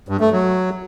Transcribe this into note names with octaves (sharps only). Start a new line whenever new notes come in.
G2
A3
F#3